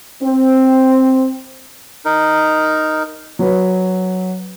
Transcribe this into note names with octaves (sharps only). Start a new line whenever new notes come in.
C4
D#4 A#4
F#3 B4